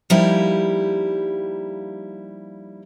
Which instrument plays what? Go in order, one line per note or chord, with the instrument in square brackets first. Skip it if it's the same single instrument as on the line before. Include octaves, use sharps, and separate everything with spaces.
[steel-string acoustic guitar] F3 G3 A#3 D#4 E4 G4